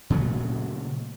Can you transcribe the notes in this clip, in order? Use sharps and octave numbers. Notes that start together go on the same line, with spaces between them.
A#2 C#3 F#3 A3